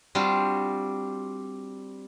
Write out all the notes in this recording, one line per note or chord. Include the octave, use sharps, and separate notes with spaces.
G3 C4 D4 F4 F#4